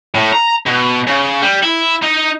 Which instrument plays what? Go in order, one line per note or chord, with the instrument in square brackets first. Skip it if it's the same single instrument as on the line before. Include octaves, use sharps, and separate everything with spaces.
[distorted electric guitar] A2
A#5
B2
C#3
G3
E4
D#4